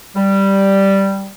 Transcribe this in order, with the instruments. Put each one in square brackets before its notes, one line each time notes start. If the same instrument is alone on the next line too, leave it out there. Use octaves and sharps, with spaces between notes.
[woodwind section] G3